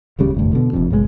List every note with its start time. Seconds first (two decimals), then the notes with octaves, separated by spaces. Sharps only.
0.19 D1 D#2 C#3 G3
0.34 F1 D2 G2
0.53 B2 D3
0.73 F1 A#1 F2
0.90 F#1 B1 B2 G#3